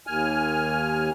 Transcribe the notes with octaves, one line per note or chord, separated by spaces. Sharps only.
D#2 G#5 F6